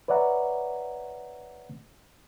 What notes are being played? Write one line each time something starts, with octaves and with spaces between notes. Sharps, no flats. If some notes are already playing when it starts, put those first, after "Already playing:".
B4 C#5 D5 E5 F#5 A#5